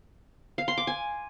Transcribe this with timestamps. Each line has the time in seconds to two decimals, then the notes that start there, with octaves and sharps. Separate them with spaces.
0.58 F5
0.68 C6
0.78 D6
0.87 G#5